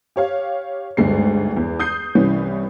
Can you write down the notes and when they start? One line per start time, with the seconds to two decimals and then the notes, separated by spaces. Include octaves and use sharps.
0.16 G4 C#5 F5
0.97 G1 D2 G#2 G3 G#3 C7
1.57 E2
1.79 D#6 G6 C7
2.15 C2 E3 G3 C#4